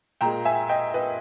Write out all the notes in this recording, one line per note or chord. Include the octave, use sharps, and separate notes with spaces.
A#2 G#3 G5 A#5
E5 G#5
D#5 G5
B4 D#5